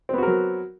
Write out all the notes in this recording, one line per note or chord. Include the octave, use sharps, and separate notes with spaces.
F#3 B3 C4 F#4 A#4